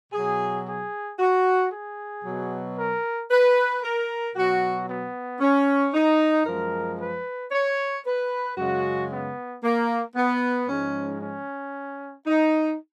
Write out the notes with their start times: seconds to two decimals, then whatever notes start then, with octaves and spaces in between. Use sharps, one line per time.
0.13 B2 F#3 G#4
0.66 G#4
1.19 F#4
1.71 G#4
2.24 B2 F#3
2.77 A#4
3.30 B4
3.82 A#4
4.35 B2 F#3 F#4
4.88 B3
5.40 C#4
5.94 D#4
6.46 F#2 F3 G#3 A#4
6.98 B4
7.51 C#5
8.05 B4
8.57 F#2 C#3 G#3 F#4
9.10 B3
9.63 A#3
10.16 B3
10.68 G#2 F3 G#3 C#4
11.21 C#4
12.27 D#4